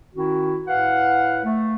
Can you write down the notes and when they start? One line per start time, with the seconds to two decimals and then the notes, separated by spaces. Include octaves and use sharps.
0.14 D#3 C#4 E4 F#4
0.67 A2 B4 F5 F#5
1.44 A3